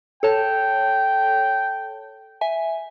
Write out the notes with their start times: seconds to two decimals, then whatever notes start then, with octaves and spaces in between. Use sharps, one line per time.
0.23 A4 C#5 G5 A5
2.41 E5 G#5